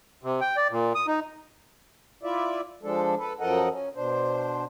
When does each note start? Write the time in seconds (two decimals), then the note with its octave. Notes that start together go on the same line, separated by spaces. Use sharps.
0.23 C3
0.41 G5
0.57 D5
0.71 A#2
0.95 D#6
1.07 D#4
2.23 E4 F4 D5 E5
2.83 F3 G#3 D4 A4
3.18 A4 B4
3.40 F#2 F3 A4 A#4 D#5 F#5
3.71 C#4
3.95 B2 D4 C5